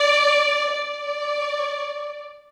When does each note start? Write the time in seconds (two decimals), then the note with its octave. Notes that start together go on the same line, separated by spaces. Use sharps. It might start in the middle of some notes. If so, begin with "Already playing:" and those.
Already playing: D5
0.72 D5